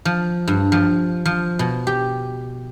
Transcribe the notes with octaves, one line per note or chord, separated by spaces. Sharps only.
F3
G2
F3
F3
B2
G4